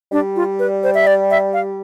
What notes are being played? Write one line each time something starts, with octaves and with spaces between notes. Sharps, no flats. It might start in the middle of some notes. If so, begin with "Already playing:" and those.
G3 D4
F4
B4
C5
E5
D5
E5
F5